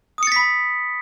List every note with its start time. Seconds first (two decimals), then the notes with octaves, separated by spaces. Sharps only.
0.18 D#6
0.23 C#7
0.27 A6
0.32 B6
0.36 B5